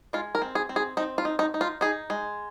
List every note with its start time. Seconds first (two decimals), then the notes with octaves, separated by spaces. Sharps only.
0.13 G#3 F4
0.35 A#4
0.42 C4
0.55 G#4
0.69 C4
0.76 G#4
0.97 C4 D#4
1.18 F4
1.25 D#4
1.39 D#4
1.54 D#4
1.61 F4
1.81 D#4 G#4
2.10 G#3